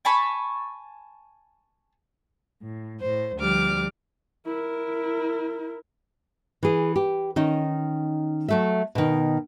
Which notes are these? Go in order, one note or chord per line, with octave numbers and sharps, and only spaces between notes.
G#5 A5 B5 C#6
A2
A2 C5
D2 F3 G3 D6 F6
E4 A#4
E3 G#4
G4
D#3 C#4 D#4
F#3 A3 E5
B2 D#3